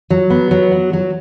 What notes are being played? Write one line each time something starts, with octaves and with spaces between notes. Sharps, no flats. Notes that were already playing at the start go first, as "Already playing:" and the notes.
F#3
B3
F#3
F#4
F#3